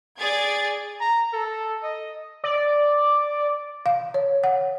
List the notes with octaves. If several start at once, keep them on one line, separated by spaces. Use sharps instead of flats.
G#4 D5 G#6 A6
A#5
A4
D#5
D5
F5
C#5
F#5